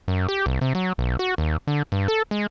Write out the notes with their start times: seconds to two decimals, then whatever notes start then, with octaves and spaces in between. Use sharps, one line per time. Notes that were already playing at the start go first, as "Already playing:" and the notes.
0.08 F#2
0.29 G4
0.46 C2
0.61 C3
0.75 F#3
0.98 B1
1.19 F#4
1.38 D#2
1.67 D3
1.92 G2
2.08 A4
2.31 G#3